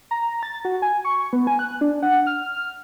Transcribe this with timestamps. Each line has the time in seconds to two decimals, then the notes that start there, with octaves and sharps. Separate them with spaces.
0.11 A#5
0.43 A6
0.65 F#4
0.82 G#5
1.05 C#6
1.33 B3
1.47 G#5
1.59 F#6
1.81 D4
2.02 F#5
2.27 F6